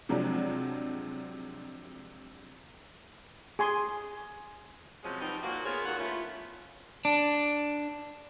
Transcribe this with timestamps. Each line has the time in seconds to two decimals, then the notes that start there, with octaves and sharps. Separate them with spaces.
0.09 C3 F3 F#3 G#3 D4
3.59 G#4 G#5 C6
5.03 C3 F3 F#3 G#3 C#4
5.21 F3 G3 B3 C4 D#4
5.43 A#2 A#3 F#4
5.65 B3 F4 G#4 A#4 B4 C#5
5.86 D#2 A#2 F4 F#4 A#4 F#5
5.98 A3 B3 C#4 E4 F4
7.05 D4